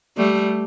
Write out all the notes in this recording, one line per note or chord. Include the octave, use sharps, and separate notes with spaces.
G3 A3